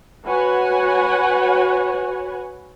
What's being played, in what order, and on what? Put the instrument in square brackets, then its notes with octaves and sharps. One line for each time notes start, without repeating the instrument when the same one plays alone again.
[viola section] F#4 B4 C#5 F#5 G#5